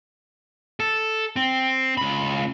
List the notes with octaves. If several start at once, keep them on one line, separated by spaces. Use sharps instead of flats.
A4
C4
C#2 B5